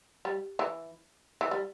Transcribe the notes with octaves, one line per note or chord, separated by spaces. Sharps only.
G3
E3
E3
G3